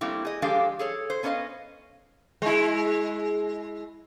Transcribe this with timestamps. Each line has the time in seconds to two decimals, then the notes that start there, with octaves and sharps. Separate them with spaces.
0.01 G3 A3 A#3 C4 E4
0.25 G#4 D#5
0.42 F3 G#3 D4 G4 A4 F5
0.79 G#4 A4 C#5
1.10 C5
1.23 B3 C#4 D4 E4 D#5 F5
2.42 G#3 E4